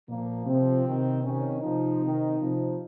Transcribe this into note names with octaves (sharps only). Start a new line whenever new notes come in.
A#2 F3 A#3
C3 F3 C4
C3 D#3
C3 D#3 C#4
C3 F3 D#4
C3 D#3
C3 F3